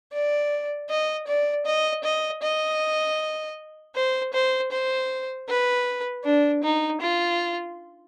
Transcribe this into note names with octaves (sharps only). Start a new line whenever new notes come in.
D5
D#5
D5
D#5
D#5
D#5
C5
C5
C5
B4
D4
D#4
F4